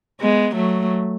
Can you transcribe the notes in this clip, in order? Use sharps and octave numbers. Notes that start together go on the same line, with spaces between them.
G#3 B3
F#3 A3